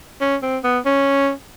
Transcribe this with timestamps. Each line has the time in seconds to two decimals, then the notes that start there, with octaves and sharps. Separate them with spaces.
0.21 C#4
0.42 C4
0.64 B3
0.86 C#4